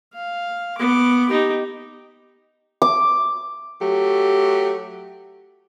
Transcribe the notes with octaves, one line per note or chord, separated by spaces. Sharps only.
F5
B3 D6
D#4 G4
D6
F#3 A3 G4